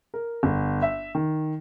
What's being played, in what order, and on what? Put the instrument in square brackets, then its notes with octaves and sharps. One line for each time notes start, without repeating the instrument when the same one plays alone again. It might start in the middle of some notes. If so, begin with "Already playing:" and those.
[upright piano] A#4
G1
E5
D#3